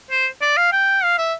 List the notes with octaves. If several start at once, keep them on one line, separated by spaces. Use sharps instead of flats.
C5
D5
F5
G5
F5
E5